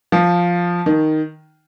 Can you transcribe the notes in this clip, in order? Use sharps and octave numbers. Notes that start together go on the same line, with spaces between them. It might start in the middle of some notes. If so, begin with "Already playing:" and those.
F3
D#3